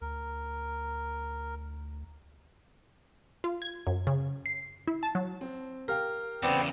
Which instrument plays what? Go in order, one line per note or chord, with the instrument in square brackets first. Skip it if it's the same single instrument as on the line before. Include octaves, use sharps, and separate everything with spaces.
[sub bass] D2 [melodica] A#4
[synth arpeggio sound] F4
G#6
F#2
C#3
C7
E4
A5
F#3
[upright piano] C4
[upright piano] G4 F5 G5 [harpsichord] A#4
[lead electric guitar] E2 C#3 [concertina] B3 C4 [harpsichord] D5